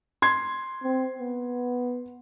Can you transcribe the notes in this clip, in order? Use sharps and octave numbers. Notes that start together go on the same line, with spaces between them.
C6 G#6
C4
B3